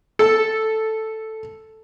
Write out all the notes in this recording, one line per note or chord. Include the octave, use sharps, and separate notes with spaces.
A4 A5